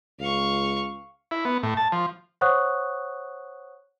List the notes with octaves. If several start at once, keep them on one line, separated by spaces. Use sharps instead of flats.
C#2 F5 C#6
E4
B3
A2
A5
F3
C5 C#5 F#5 C#6 D#6 F#6